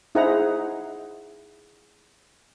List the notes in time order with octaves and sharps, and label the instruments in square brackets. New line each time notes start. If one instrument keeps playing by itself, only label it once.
[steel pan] D#4 E4 G#4 C5 F#5 A#5